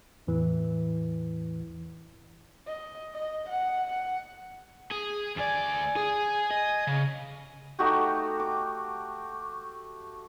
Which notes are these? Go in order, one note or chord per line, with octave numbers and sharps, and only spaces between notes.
E2 A2 E3
D#5
D#5
F#5
F#5
G#4
D2 D5 G#5
G#4
D#5
C#3
A3 D#4 F#4 G4
D6